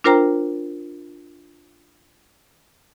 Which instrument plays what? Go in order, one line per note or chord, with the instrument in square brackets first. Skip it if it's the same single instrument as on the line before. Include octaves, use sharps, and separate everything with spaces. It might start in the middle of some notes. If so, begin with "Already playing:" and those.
[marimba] D4 F4 A#4 C5 G5 A#5